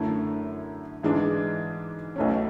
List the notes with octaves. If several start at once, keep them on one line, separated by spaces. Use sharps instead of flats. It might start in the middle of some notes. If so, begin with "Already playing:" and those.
Already playing: F#2 D3 A3 E4
G#2 E3 G#3 D4
B1 B2 A3 C#4